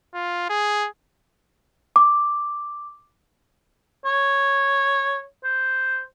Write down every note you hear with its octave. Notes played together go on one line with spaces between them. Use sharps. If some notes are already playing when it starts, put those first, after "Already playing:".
F4
G#4
D6
C#5
C5